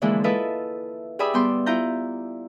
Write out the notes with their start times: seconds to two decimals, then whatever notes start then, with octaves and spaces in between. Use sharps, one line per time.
0.02 D3 E3 F3 G#3 A#3 E4
0.24 E4 F4 A4 B4 D#5 E5
1.19 G4 G#4 D5 E5 B5 D#6
1.34 G3 B3 G5 C6
1.66 E4 F4 A#5 G6